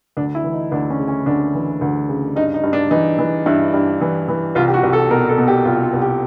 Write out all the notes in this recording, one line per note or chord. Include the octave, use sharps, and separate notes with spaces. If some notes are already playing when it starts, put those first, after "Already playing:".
D2 D4
E4
E3
D#4
D2 D4
C#4
C#3
C#4
D2 D4
E3
D2
C#3
G2 D#4
D#4
G2
D4
E3 D#4
E3
G2 E4
G2
E3
E3
C2 F4
G4
F#4
C2
A4
B2 A#4
A4
B2
G4
C2 F4
F4
C2
G4